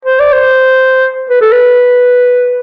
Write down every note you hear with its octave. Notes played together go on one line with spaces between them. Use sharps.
C5
D5
C5
B4
A4
B4